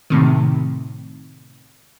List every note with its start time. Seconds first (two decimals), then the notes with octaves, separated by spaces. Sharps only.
0.10 A2 C3 D#3